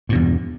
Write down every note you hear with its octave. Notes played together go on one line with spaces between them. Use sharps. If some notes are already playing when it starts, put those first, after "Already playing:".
E2 G2 B2